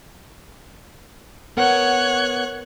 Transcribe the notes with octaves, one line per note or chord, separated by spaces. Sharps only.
B3 A#4 C#5 F#5 F#6 G#6